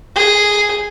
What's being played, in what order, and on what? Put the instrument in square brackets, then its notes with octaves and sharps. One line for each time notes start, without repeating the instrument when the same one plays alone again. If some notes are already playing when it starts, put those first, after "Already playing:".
[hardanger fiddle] G#4